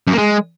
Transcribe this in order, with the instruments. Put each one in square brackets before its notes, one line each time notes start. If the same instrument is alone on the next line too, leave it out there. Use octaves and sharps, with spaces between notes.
[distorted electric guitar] F#2
A#3
G#3